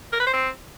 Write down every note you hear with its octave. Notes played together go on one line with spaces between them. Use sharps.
A#4
B4
C5
C4